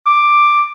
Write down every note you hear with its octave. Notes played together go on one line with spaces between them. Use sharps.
D6